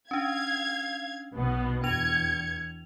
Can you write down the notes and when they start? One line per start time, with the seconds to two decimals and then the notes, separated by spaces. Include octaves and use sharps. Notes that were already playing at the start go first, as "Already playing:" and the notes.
0.11 C#4 D4 F5 G#6
1.33 B1 B2 B3
1.84 E2 D4 G#6 C#7 F7